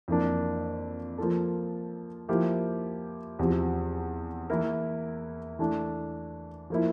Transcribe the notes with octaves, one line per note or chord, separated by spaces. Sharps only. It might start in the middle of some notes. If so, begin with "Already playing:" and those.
F2 E3 A#3 D4
F3 A#3 F4 A4
F3 A#3 E4 G4
E2 C3 F3
E3 A#3 E4 A#4
E3 A3 D4
F3 A#3 E4